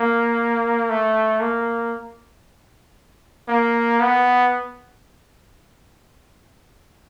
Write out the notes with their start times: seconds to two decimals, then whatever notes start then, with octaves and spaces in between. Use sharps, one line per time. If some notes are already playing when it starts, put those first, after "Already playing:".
Already playing: A#3
0.89 A3
1.40 A#3
3.48 A#3
4.00 B3